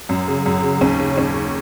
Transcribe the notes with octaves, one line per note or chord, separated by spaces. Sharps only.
F#2
C#3
F#2
C#3
D#2 C#4
C#3
D#2 C#4
C#3